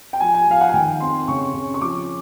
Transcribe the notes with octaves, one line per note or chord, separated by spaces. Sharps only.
G5
F3 G#5
G#5
F3 F5
F#5
G#5
D#3 G5
C4 C6
C#3 C#6
C#3
C#6
F3 D6